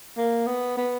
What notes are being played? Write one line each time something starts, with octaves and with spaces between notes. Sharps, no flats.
A#3
B3
B3